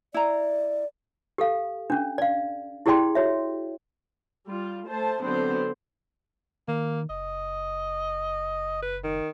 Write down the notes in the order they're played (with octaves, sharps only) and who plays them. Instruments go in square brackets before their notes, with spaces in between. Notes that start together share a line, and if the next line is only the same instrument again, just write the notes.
[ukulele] E4 A#5 [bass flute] D5
[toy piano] G4 A4 F5
C#4 D4
D5 F5
E4 G4 G#4 D5 G5 C6
F#4 C#5 E5
[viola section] G3 F4
A3 C5 A5
D3 F#3 B3 C4 C5
[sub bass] D#3 [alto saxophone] A#3
[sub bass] F#1 [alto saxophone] D#5
[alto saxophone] B4
D#3